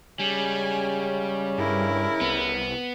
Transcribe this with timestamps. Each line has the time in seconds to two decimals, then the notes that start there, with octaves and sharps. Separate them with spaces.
0.20 C#3 G3 G#3 C#4 G#5
1.58 G2 E4 A#4
2.21 C2 B3